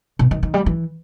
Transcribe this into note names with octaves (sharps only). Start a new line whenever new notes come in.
B2
D#3
D#3
G3
E3